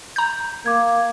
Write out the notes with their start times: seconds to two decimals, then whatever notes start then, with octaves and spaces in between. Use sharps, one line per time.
0.16 A#5 G6
0.66 A#3 D6 G#6